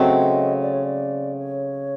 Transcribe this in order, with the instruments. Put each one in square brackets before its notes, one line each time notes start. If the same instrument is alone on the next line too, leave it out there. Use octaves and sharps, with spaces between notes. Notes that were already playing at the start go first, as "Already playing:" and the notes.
Already playing: [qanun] C#3 F#3 A3 C4 [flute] D#5
[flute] D5
C#5
D5
C#5